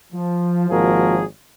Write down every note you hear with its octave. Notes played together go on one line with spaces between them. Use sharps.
F3
G#1 F3 A#3 F#4 G#4 A#4